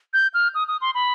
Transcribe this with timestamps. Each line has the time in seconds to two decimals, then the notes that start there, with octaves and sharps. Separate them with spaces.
0.13 G6
0.34 F6
0.55 D#6
0.68 D#6
0.81 C6
0.95 B5